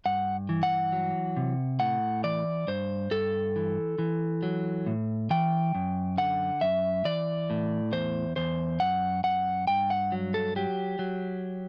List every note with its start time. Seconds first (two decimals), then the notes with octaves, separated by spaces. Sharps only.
0.06 G2 F#5
0.49 E3
0.63 F#5
0.92 F#3
1.37 C3
1.80 A2 F#5
2.24 E3 D5
2.67 G2 C5
3.11 G2 A4
3.56 E3
3.98 E3
4.43 F#3
4.86 A2
5.30 E3 G5
5.75 F#2
6.18 D3 F#5
6.61 F#2 E5
7.05 E3 D5
7.50 A2
7.92 E2 C5
8.36 E2 C5
8.80 F#2 F#5
9.24 F#2 F#5
9.67 G2 G5
9.90 F#5
10.12 F#3
10.34 A4
10.56 F#3 G4
10.99 F#3